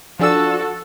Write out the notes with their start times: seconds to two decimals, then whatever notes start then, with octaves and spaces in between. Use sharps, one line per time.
0.19 F3 D4 F#4 A4 E6